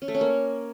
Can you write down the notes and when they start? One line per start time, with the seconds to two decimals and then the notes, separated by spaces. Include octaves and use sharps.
0.02 C#4
0.08 A3
0.14 C#4
0.21 A#3